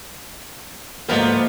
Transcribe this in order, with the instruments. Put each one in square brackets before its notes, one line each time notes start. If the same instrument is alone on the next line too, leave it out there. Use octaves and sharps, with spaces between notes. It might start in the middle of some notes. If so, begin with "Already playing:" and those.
[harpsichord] D2 G#2 [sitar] F3 B3 A#4 [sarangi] A#3